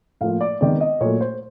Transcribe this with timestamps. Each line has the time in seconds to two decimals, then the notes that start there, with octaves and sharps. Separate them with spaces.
0.21 A2 F3 A#3 F5
0.41 D5
0.61 C3 D#3 G#3 B3 D5
0.81 D#5
1.01 A#2 F#3 A3 C#5
1.20 C5